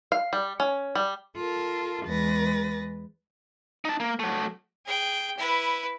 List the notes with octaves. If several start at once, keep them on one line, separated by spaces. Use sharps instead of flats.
F5
G3
C#4
G3
F4 A4 A#4
E2 G#3 B4 A6 A#6
D#4 A5
A#3
F#3 A3
G#4 G5
E4 B4